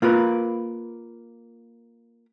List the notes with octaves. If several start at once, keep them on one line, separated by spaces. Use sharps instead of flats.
A#3 F4 A#4 B4